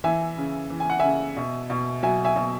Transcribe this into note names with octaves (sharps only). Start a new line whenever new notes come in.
E3 E5 G#5
C#3
E3
G#5
F#5
C#3 E5 G#5
B2
B2
F#3 E5 G#5
E5 G#5
B2